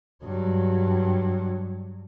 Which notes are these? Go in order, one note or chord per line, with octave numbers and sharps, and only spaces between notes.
G2 F#3